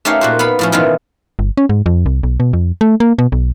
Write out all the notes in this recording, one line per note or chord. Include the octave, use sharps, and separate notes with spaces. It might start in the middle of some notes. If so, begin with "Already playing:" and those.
A3 C#4 D#4 G4 C#5 F5
A#2 F#4 C5
B3 F5 B5
A2 F3 C#4
B2 D#3 E3 B3 F4
G1
C#4
G#2
F2
C2
B1
B2
F2
A3
A#3
B2
B1